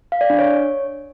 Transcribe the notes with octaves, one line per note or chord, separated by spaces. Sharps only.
F5
D5
D4
C#5